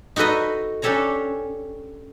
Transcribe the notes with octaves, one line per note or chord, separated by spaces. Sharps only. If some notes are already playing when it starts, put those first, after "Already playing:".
D#4 F#4 A4 B4 D#5
C#4 D4 G4 A4 C#5 A#5